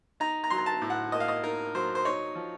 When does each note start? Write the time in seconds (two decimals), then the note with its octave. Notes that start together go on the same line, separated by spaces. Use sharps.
0.20 D#4 A#5
0.44 A#5
0.50 F#3 C6
0.58 A#5
0.66 A5
0.82 A2
0.90 F#5
1.12 A#3 D#5
1.20 F5
1.28 D#5
1.43 D#4 A#4
1.75 F#3 C5
1.95 C5
2.05 D#4 C#5
2.35 F3